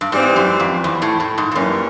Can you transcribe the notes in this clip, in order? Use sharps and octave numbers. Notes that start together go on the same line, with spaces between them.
G2
G#2 E3 G3 C4
F#2
F2
E2
A2
A2
G#2
F2
F#2 E3 G3 A#3 C#4